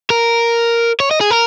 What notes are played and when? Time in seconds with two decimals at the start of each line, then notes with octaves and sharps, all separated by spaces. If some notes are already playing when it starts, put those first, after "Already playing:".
0.10 A#4
1.00 C#5
1.11 D#5
1.21 G#4
1.31 A#4